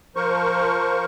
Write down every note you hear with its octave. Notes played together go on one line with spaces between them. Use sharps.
F3 A#4 C5 C#6